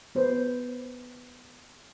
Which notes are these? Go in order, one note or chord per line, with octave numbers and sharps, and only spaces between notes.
B3 B4 C5